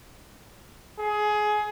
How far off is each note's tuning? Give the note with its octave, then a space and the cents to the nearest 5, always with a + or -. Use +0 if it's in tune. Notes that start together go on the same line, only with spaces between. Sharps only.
G#4 +20